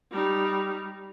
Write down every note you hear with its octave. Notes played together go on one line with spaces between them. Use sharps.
G3 D#4